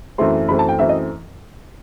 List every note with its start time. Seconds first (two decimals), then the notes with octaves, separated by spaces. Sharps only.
0.18 F#2 E3 A3 C4 C6
0.48 F#2 E3 A3 C4 B5
0.59 A5
0.69 G5
0.79 F#2 E3 A3 C4 E5
0.89 D#5